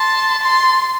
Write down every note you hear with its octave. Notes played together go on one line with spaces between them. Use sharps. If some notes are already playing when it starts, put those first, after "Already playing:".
Already playing: A5 C6
C6